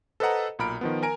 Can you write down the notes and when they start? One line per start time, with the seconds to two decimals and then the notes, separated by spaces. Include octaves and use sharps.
0.20 A4 B4 C5 D#5 F#5 A#5
0.59 B1 A#2 A#5 B5 F6 D7
0.81 D#3 F3 B3
1.03 A#4 G#5 A#5 D7